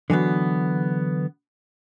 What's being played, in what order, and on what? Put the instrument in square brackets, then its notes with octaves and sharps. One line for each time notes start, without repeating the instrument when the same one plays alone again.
[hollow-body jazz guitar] D3 E3 F#3 B3